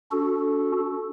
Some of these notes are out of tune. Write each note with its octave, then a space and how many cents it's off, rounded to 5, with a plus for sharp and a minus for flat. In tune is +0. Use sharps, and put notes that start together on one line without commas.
D4 -40 F#4 -10 A4 +0